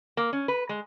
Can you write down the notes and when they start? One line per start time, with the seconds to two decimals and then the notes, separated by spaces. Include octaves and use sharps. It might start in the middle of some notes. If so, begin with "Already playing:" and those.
0.17 A#3
0.33 C#4
0.48 B4
0.69 G#3